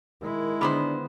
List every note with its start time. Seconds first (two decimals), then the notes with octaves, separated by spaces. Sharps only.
0.21 D#3 G#3 E4 A#4
0.61 D3 D#3 B3 D4 C5 B5 D6